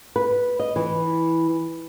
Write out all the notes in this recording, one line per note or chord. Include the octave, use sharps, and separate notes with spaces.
B4
D#5
E3